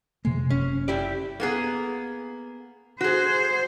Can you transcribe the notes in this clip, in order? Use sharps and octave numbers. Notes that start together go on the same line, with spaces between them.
F2 C3 G#3 A#3
F#1 C#4
E4 G4 D5
A#3 B3 G#4
F#4 G#4 C5